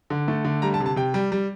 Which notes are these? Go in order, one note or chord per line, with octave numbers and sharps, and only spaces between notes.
D3
A3
D3
G3 A#5
A5
C3
A5
C3 G5
G3
G3